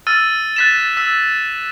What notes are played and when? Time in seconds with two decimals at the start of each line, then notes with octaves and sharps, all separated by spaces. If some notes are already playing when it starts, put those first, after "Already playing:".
0.07 E6 F6 A6 D#7
0.56 F#6 A6 B6 D#7 E7
0.97 E6 B6